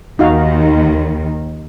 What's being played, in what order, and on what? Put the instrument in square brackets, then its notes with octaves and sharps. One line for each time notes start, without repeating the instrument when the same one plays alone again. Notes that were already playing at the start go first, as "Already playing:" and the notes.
[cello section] D#2 D#3 [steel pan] D#4 F#4 F5